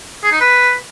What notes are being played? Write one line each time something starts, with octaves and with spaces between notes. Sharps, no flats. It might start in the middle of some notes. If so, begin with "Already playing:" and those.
G#4
D#4
B4